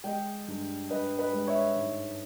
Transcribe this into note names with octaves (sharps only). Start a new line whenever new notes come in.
G#3 D#5 G5
G2
G2 B4 D#5
B4 D#5
G#3
C#5 E5
G#2